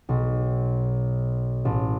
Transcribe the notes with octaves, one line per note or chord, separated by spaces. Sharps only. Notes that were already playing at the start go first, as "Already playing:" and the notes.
B1
A1